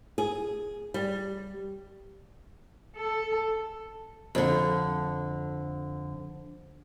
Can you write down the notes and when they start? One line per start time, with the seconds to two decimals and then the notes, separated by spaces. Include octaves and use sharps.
0.18 G#4
0.94 G3
2.97 A4
4.35 F2 D3